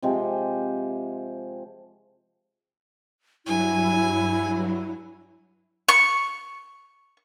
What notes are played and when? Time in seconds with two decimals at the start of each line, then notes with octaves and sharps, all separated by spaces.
0.02 C3 F3 G#3 G4
3.46 G2 F#3 E4 G#5
5.89 C#6